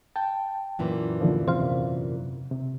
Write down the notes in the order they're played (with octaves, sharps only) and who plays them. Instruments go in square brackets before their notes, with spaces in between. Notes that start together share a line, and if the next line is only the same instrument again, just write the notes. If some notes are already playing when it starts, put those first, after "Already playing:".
[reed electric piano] G5 A5
[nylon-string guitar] F#2 A#2 E3
[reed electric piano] D#2 D3 F3
[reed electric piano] E2 C3 [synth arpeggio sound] C5 F5
[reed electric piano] C3